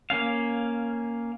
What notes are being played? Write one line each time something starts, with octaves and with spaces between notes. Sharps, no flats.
A#3 C#4 F5